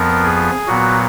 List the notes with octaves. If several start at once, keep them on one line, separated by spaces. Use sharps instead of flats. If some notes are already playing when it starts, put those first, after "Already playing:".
Already playing: F2 F3 B3 A#4
G#4
A#2 F#3 B3 F#4